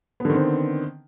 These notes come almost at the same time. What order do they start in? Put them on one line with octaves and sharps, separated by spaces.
B3 D3 D#3 C4